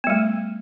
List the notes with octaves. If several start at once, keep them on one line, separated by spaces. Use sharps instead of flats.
G3 A3 B3